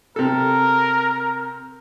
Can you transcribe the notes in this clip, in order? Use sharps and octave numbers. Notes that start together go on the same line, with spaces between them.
C3 A4 A#4